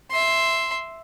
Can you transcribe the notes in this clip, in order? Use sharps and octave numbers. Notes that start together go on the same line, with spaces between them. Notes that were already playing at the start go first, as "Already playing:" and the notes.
E5 C6